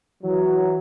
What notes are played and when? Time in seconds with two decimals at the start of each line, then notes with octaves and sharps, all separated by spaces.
0.23 E3 F#3